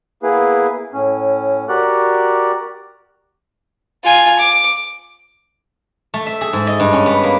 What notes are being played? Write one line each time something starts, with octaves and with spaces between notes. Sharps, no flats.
A#3 B3 E4 G#4 B4
A2 C#4
F#4 G4 A#4 D5 F#5 F#6
F4 G#5
D6
A3
E5
G#4
G#2
D#5
G2
C#4
B3
A#3